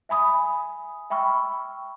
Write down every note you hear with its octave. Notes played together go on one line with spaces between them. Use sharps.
E5 G#5 B5 D#6
E5 G5 B5 C#6 E6 F6